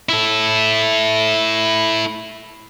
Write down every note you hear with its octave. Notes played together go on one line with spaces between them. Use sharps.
E4 A4